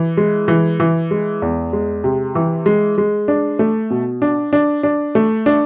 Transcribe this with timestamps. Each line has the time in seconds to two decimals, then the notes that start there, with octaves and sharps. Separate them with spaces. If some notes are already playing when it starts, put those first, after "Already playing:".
Already playing: E3
0.17 G#3
0.48 E3
0.80 E3
1.11 G#3
1.42 E2
1.73 G#3
2.04 C3
2.35 E3
2.66 G#3
2.98 G#3
3.28 D4
3.59 A3
3.90 B2
4.22 D4
4.53 D4
4.83 D4
5.15 A3
5.46 D4